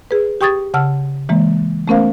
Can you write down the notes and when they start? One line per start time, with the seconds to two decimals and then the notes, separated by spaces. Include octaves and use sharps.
0.11 G#4 B4
0.41 G4 G5 C#6 D#6 G#6 A6
0.74 C#3 F#5 A5 E6 F6
1.29 E3 G#3 A#3
1.88 A3 B3 C#4 A#4 C5 F5